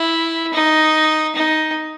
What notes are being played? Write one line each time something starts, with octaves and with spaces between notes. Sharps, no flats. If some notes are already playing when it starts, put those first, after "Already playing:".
Already playing: E4
D#4
D#4